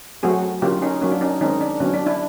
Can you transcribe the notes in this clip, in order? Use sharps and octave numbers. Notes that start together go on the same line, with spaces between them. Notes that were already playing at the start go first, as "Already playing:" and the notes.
F#3 A3 C4 F#4 G#4
D3 F#3 A#3 C#4 F4 G4
C#4 D#4
F#3 A#3 C#4
D4
C#4 D#4
D#3 G#3 C4 C#4 D#4
D4
D3 F#3 B3 C#4
D4
D4 E4